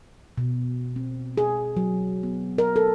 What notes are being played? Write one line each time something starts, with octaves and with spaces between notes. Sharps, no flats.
B2
C4
G#4
F#3
B3
A#4
A4